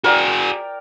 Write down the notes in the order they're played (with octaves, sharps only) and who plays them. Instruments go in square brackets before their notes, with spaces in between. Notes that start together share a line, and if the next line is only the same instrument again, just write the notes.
[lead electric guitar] F#4 G#4 [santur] A#4 D5 G5